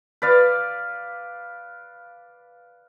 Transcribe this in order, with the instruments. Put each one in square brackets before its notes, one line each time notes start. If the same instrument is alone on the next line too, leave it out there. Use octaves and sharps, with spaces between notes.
[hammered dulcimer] B4 D5 F5